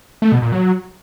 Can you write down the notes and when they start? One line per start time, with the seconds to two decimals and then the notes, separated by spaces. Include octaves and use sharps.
0.22 A3
0.32 B2
0.42 A#2
0.52 F#3